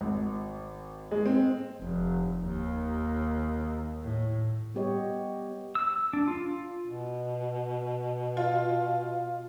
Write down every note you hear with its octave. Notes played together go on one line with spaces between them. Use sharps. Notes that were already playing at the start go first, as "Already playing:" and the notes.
G#1
G#3
C4
F1
D#2
A2
G3 B3 G4 C#5 D#5
E6
D4
F4
B2
F4